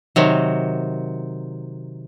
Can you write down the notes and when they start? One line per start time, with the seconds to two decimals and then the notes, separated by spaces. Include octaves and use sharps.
0.16 C3 D#3 F#3